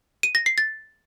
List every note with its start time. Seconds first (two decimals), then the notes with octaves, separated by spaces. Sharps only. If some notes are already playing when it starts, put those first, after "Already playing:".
0.23 D#7
0.35 A#6
0.46 C7
0.58 A6